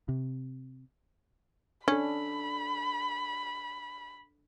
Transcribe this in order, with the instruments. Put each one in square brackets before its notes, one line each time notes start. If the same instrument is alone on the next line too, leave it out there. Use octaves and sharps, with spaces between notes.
[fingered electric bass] C3
[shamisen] C#4 [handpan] D4 A4 [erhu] B5